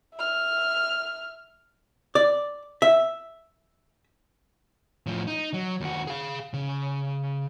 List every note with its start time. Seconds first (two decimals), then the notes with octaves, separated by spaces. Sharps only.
0.15 E5 F6
2.15 D5
2.82 E5
5.07 A2 F3
5.27 D#4
5.54 F#3
5.81 D#2 F#4
6.07 G#4 F5
6.54 C#3